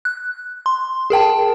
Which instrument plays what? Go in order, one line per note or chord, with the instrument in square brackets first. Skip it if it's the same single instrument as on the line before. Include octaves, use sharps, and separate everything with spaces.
[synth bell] F#6
C6
G#4 A#4 G5 A5